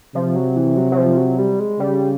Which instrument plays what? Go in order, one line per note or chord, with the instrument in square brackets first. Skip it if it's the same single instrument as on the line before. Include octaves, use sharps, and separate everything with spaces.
[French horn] C3 [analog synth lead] F3
[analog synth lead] F#3
E3
F#3
F#3
F3
F#3
G3
G#3
[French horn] C#3 [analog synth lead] G3